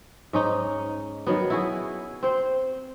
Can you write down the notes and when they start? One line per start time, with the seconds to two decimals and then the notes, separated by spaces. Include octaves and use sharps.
0.33 G#2 C#4 D#4
1.27 D#3 F#3 B3
1.50 E4 F#4 G#4
2.23 C4 C5